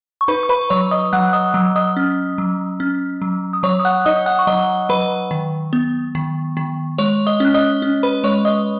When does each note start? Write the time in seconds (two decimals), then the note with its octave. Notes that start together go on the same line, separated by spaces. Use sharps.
0.21 C#6
0.28 D#4 B4 B5
0.43 C#6
0.49 B4 B5
0.70 F#3 C#5 C#6
0.91 D#5 D#6
1.13 F#3 F#5 F#6
1.33 D#5 D#6
1.54 F#3
1.76 D#5 D#6
1.97 C#4
2.38 F#3
2.80 C#4
3.22 F#3
3.53 D#6
3.63 F#3 C#5 C#6
3.80 D#6
3.85 F#5 F#6
4.05 D#4 D#5 D#6
4.26 F#5 F#6
4.39 C#6
4.47 F#3 D#5 D#6
4.89 F#3 B4 B5
5.31 D#3
5.73 B3
6.15 D#3
6.57 D#3
6.98 G#3 C#5 C#6
7.27 D#5 D#6
7.40 C#4 F#6
7.54 D#5 D#6
7.82 C#4
8.03 B4 B5
8.24 G#3 C#5 C#6
8.45 D#5 D#6